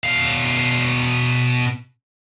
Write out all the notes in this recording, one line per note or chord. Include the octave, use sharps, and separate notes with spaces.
B2 F5